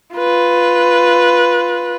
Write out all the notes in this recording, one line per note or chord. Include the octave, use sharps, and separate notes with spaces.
F4 B4